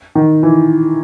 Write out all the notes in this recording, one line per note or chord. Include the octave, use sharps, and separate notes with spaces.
D#3
E3